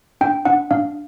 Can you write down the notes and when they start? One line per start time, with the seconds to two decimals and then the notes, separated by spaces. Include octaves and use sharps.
0.21 D4 G5
0.45 D4 F#5
0.71 D4 F5